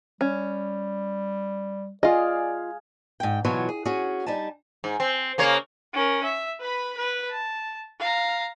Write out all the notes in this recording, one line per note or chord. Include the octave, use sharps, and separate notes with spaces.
G3 C#4
F4 G#4 D5 D#5 F5
G#2 G5
B2 E3 F#3 F4 C#5
G#4
C#4 F#4 G#4
G3 D#4 G#5 A5
G#2
C4
C#3 A#3 C#5
C#4 A#4
E5
B4 B5
B4
A5
F5 A#5